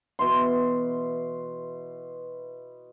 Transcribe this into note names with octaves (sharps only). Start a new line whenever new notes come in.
B2 E3 C6